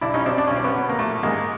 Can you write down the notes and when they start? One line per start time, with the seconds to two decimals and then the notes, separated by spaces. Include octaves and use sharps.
0.01 B1 D4 E4
0.14 C#4 D#4
0.26 B2 C4 D4
0.38 D4
0.47 B1 C#4
0.56 C4
0.64 B3 C#4
0.75 B2
0.89 A#3
0.99 A#1 A3
1.23 G#2 D#3 G#3 A#3